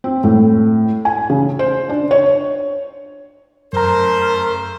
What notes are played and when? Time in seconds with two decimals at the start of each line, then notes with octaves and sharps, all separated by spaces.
0.04 C4
0.24 A2
1.05 G#5
1.30 C#3
1.59 C5
1.89 D4
2.11 C#5
3.73 F#2 C#3 A3 A#4 C5 A#5